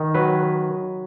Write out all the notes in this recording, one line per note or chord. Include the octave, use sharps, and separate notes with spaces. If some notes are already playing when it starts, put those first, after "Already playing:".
Already playing: D#3
F#3 B4